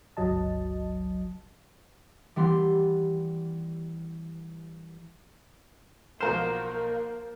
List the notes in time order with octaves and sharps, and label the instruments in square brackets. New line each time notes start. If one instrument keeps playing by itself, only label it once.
[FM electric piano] G1 C#2 F#3 D#5 A5
[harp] E3 G3 B3 C6
[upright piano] B1 F#5 F6 [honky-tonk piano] F3 A#4 E7 [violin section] A#3 [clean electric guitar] C5